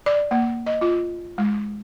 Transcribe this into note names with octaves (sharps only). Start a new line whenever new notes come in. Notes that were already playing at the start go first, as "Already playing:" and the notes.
D5
A#3
D#5
F4
G#3